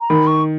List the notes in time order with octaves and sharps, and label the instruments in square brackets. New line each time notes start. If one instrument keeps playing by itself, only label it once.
[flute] A#5
[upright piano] D#3 [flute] B5
[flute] C#6